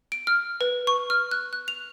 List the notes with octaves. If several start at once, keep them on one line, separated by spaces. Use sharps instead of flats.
D7
F6
B4
C#6
F6
F#6
F#6
F7